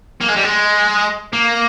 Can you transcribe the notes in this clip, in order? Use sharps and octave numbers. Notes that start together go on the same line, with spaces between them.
A#3
G#3
G3
G#3
A#3